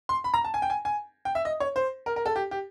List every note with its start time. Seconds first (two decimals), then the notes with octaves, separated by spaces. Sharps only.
0.09 C6
0.24 B5
0.34 A#5
0.44 A5
0.54 G#5
0.62 G5
0.70 G#5
0.85 G#5
1.25 G5
1.35 E5
1.45 D#5
1.60 C#5
1.76 C5
2.06 A#4
2.16 A#4
2.26 A4
2.36 G4
2.51 G4